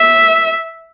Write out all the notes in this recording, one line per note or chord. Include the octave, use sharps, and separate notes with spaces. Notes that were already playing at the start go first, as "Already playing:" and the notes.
Already playing: E5